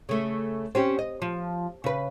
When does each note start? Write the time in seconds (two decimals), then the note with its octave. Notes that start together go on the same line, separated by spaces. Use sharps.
0.09 C#3 A3
0.75 C4 C#4 G4
0.99 D#5
1.22 F3
1.84 C#3 B4